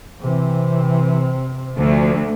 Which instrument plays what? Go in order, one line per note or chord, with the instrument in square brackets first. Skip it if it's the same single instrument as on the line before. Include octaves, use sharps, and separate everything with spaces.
[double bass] C3 C4 [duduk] E3
[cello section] D2 [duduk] F3